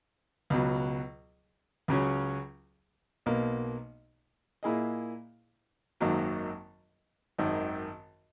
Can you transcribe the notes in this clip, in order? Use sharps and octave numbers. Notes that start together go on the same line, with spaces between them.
C#2 B2 F#3
C#2 C#3 F#3 C#4
B1 B2 A#3
A#2 A#3 E4 G#4 D#5
G#1 F#2 D#3 F#3 A#3
G#1 F#2 D#3